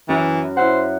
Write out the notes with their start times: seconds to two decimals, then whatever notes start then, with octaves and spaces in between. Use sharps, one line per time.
0.09 F#2 E3
0.57 E4 C5 E5 F#5